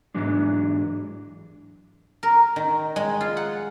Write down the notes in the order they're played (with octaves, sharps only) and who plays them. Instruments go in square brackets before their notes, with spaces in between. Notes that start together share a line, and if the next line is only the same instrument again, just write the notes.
[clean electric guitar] G#2 E3 F#3 G#3 D4
[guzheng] A#4
D#3
G#3
F4
F#5